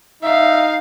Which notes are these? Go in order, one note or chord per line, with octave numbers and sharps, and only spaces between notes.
D#4 E5 F5